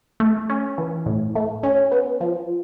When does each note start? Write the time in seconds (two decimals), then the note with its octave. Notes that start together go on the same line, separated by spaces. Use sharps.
0.20 A3
0.50 C#4
0.78 E3
1.06 A2
1.35 A3
1.63 C#4
1.92 B3
2.21 F3